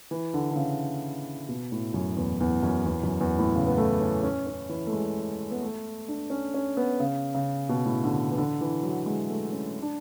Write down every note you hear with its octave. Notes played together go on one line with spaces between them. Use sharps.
E3
D3
D3
C#3
B2
A2
F#2
E2
E2
F#2
E2
F#2
E2
A2
C#3
B3
A3
C#4
C#4
C#4
E3
A3
G#3
B3
A3
D4
C#4
C#4
B3
C#3
C#3
B2
A2
D3
E3
D3
E3
F#3
G#3
A3
C#4
D4